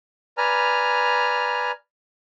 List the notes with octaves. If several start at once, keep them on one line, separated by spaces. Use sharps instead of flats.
B4 D5 G#5 A#5 F6